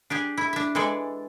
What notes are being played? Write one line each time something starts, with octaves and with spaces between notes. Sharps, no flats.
D4 G4 G#4
E4
D4 E5
E3 G#3 G#4 A4 D5